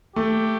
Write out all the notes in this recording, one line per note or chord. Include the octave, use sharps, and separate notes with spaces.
A3 G4